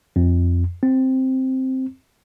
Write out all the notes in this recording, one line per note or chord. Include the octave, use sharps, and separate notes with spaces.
F2
C4